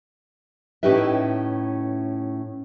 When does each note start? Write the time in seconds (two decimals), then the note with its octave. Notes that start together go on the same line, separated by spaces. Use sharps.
0.83 A2 C#4 D#4 G4 B4 E5